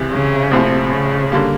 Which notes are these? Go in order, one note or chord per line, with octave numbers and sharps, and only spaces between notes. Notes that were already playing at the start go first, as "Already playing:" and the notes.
Already playing: C#2 C3 E3
C#3
A#1 A2 C3 F3
C#3
D3 G3 A#3